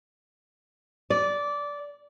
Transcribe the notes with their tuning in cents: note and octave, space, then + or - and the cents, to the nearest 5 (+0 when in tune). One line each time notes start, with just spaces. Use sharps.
D5 -15